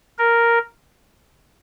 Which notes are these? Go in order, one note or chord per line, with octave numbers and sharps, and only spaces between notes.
A#4